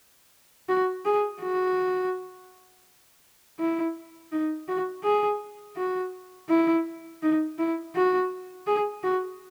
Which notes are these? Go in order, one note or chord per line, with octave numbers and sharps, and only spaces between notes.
F#4
G#4
F#4
E4
D#4
F#4
G#4
F#4
E4
D#4
E4
F#4
G#4
F#4